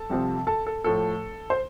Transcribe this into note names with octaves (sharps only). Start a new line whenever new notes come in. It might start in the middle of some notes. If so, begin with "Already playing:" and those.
Already playing: A4 A5
C2 C3 F3 C4
A4 A5
A4
A2 F3 A3 A4
C5